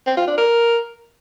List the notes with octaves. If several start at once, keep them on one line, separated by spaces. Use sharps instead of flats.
C4
F4
D4
A#4